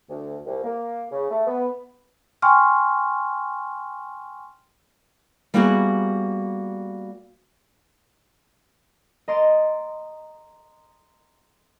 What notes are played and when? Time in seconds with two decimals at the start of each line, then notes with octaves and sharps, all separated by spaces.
0.09 D2
0.46 C2
0.63 A#3
1.11 C#3
1.30 A3
1.46 B3
2.42 G5 G#5 C6 C#6 F6
5.54 G3 A#3 B3 E4 F#4 G#4
9.28 D#5 A#5 C6 A6 D7